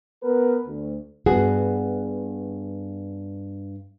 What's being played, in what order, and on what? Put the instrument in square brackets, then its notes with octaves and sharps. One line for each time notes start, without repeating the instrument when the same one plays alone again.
[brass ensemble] B3 A#4 B4
D2
[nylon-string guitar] G2 B3 F#4 G#4